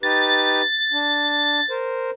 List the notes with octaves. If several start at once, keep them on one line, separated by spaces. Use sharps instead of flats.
D#4 G4 B4 A6
D4
A#4 C5